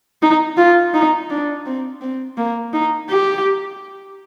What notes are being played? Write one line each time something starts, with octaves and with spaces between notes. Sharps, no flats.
D#4
F4
D#4
D4
C4
C4
A#3
D#4
G4